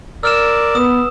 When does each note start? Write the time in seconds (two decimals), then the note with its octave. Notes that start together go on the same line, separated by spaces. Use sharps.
0.23 A#4 D5 E6 F6 E7
0.75 B3 D#6